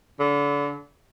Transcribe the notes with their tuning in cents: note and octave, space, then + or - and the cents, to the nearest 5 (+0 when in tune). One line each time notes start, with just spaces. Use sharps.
D3 -35